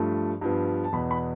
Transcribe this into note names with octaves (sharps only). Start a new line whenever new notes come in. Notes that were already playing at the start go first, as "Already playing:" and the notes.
Already playing: G2 F3 A3
G2 F3 B3
A5
E2 B2 B3 B5
B5